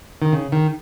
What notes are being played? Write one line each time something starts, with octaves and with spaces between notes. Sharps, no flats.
D#3
C#3
D#3